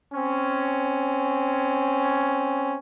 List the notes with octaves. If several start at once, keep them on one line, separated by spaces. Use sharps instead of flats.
C4 C#4